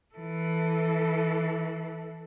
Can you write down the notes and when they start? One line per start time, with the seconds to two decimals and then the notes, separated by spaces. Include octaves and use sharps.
0.15 E3 A4